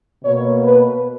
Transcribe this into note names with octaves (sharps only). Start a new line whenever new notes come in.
B2 A#3 C#5
B4